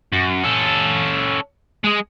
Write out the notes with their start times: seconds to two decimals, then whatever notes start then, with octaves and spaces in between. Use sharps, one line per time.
0.12 F#2
0.44 C#4 A4
1.84 G#3 G#4